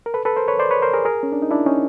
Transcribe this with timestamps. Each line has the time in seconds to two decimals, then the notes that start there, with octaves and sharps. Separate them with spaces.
0.06 A#4
0.14 A4 B4
0.25 A4 B4
0.36 A#4 C5
0.48 B4 C#5
0.59 C5 D5
0.71 B4 C#5
0.82 A#4 C5
0.94 G#4 A#4
1.05 G#4 A#4
1.23 C#4
1.32 D4
1.42 D#4
1.51 D4 E4
1.66 C#4 D#4